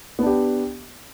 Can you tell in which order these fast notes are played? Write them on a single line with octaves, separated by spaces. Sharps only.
B3 D4 G4